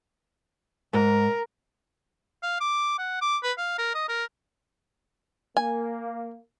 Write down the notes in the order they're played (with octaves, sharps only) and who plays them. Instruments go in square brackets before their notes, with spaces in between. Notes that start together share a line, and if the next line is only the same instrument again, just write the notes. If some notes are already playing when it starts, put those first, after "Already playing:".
[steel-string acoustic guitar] G#2 [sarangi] A#4
[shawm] F5
D6
F#5
D6
B4
F5
A#4
D#5
A#4
[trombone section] A#3 [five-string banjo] G#5